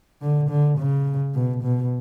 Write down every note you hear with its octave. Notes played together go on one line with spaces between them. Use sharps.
D3
D3
C#3
B2
B2